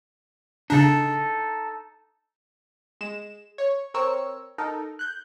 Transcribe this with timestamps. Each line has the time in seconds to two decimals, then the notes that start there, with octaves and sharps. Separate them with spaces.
0.70 C#3 D4 D#4 A4
3.01 G#3 E7
3.58 C#5
3.94 C4 A#4 C#5 E6 C#7
4.58 D#4 A4 A#4
4.99 F#6 G6